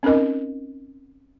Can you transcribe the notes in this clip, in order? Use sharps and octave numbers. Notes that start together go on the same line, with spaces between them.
C4 C#4 D#4 A#4 D#5